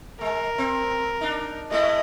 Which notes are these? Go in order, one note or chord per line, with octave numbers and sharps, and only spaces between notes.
G#3 A#4
C4
D4 D#4
G#3 A3 E4 D#5